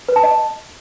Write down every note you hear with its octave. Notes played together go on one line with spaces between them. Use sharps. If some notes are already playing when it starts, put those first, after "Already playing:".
B4
A5
D#5